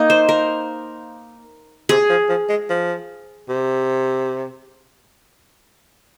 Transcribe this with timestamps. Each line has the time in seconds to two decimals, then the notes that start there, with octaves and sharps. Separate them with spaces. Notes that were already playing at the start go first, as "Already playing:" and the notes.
Already playing: A#3 D#4
0.10 C5
0.29 A#4
1.89 C3 G#4
2.10 F3
2.29 F3
2.49 G#3
2.69 F3
3.49 C3